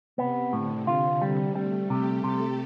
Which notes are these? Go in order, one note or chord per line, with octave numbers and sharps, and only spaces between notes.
C3 B3
A2 D3
F4
G3
G3 A3
C3 G4
C3 A4